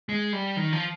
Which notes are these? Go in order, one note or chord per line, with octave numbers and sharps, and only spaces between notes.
G#3
G3
D#3
F3